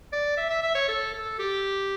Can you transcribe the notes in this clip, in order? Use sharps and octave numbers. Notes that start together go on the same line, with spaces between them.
D5
E5
E5
E5
C#5
A4
A4
G4